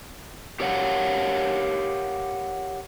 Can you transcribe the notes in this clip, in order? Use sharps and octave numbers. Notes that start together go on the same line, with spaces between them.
G4 A#4 C#5 F5 F#5